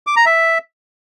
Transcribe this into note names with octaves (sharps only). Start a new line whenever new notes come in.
D6
A#5
E5